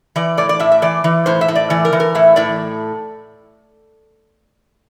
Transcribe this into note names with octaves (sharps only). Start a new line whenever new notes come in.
E3 D5
A2 D5
D5
A2 E5
E5
E3 D5
E3
A2 C5
E5
A2
D5
E3 D5
A#4
E3
A#4
A2 E5
A2 D5